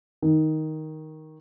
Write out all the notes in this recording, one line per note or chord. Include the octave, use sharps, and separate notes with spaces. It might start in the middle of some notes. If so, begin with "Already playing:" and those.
D#3